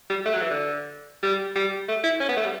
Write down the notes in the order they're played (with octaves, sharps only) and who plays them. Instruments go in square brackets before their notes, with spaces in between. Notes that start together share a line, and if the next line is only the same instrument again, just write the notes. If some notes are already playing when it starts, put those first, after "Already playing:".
[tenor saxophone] G3
A3
F#3
E3
D3
G3
G3
A3
E4
C#4
B3
A3
G3